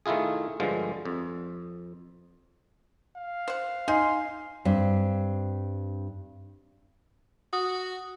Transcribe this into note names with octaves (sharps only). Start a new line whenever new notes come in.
D#3 A3 E4 F4 G#4
G2 D3 F3 G#3
F2
F5
C5 F#5
D#4 G#5 C6
G2 C4
F#4 D#6